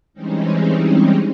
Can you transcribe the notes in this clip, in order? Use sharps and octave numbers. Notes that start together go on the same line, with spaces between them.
E3 G3 G#3 C4 C#4 D#4